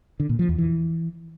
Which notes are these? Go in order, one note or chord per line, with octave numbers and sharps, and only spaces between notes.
D3
A#2
F3
E2
E3